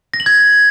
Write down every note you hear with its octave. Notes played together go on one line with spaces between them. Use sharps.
A#6
F#7
G#6